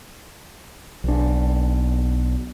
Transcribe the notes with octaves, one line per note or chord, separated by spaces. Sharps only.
B1 D4